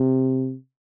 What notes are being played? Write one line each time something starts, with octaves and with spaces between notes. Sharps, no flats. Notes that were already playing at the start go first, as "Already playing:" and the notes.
Already playing: C3